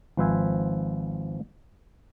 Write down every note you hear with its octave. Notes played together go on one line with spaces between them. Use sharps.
G#1 F3 B4 C5 E5 G#5